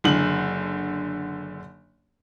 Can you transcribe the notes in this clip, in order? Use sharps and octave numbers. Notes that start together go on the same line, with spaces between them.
F#1 D3 F#7